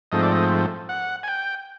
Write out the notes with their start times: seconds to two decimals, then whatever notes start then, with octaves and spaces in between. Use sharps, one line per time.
0.12 G#2 F3 A3 C4 D#5
0.22 D5
0.32 D#5
0.89 F#5
1.23 G#5
1.28 G5